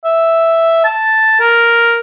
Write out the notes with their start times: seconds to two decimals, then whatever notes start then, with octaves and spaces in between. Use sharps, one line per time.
0.05 E5
0.84 A5
1.40 A#4